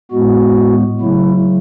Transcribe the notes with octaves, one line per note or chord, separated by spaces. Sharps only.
A2 G#3 B3 F#4
C#3 F#3 A3 E4